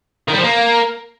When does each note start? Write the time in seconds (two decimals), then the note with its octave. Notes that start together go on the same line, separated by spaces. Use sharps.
0.28 D#3
0.33 G3
0.38 F3
0.43 A#3